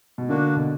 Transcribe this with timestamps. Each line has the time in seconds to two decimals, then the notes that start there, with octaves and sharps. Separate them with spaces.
0.18 B2
0.29 D3 A#3 D4 F#4
0.56 B2